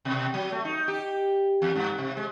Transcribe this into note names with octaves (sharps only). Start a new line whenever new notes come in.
B2
F#3
A3
D#4
G4
E2
G2
C3
G#3